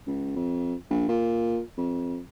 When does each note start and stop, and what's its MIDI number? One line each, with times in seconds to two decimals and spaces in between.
0.07 0.35 37
0.36 0.74 41
0.90 1.07 34
1.08 1.59 46
1.78 2.19 41